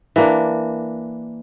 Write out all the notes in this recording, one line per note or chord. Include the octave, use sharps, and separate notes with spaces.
E3 A#3 D4